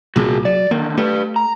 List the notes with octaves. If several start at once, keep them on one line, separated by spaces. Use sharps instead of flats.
C2 A#2 F#4 G#4
F#3 D5
D3 D#3 A#3
A3 G4 B4
A#5